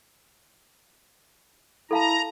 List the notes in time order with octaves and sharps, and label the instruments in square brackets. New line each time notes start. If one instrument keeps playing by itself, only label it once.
[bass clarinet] E4 [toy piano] A4 F5 A5 [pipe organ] A#5